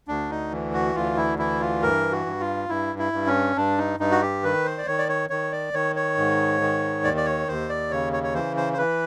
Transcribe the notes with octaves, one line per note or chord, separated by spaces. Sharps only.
D2 D4
D#4
E3
F#4
D2 F4
E4
E3 E4
F4
G2 A#4
F#4
G2
F4
G2 E4
E4
G2
C#4
G2 D4
D#4
G2 D#4
F#4
G4
D#3 B4
C5
D5
D#3 C#5
D5
C#5
D#3 C#5
D5
D#3 C#5
C#5
G#2
D#3
D#2 D5
D5
C#5
D#2 C5
D5
C#3 C#5
C#5
C#5
E3 C5
C5
C5
E3 B4